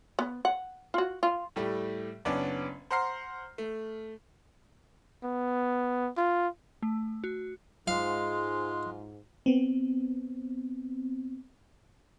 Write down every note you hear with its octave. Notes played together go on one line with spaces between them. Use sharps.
B3
F#5
F4 F#4
F4
A2 G3 A3 G4
F#1 B3 C#4 D4 D5
C5 F#5 A#5 C6 F6 C7
A3
B3
F4
A3
F#4
G#2 G#3 F4 F5
B3 C4